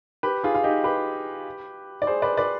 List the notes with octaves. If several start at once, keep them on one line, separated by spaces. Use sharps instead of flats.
G4 B4
F4 G#4
F4
D#4 G4
G4 B4
D5
G#4 C5
B4 D5
B4 D5